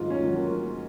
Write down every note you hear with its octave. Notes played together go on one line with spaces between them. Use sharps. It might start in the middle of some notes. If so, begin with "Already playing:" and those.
Already playing: G#2 D#3 F#3 F4
C#4
D#3 F#3
A#3